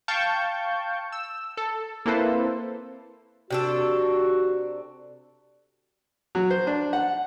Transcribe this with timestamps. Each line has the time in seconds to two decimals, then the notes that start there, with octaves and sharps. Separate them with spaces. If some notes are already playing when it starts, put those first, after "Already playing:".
0.08 F5 G5 A5 C#6 G6
1.12 E6
1.57 A4
2.06 A#3 C4 E4 A4 B4 C5
3.51 C3 D4 F#4 A4
6.35 F#3
6.50 C5
6.67 D4
6.93 F#5